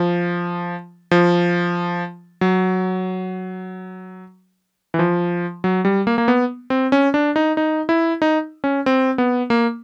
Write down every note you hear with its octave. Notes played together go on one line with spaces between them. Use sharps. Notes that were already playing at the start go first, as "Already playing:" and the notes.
Already playing: F3
F3
F#3
E3
F3
F#3
G3
A#3
A#3
B3
C4
C#4
D4
D#4
D#4
E4
D#4
C#4
C4
B3
A#3